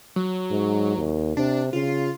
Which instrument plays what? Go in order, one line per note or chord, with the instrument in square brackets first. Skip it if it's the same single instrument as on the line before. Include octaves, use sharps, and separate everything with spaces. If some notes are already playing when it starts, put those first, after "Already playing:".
[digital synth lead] F#3
[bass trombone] G#2
D#2
[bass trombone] C3 [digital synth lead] D4
[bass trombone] C#3 [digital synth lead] F4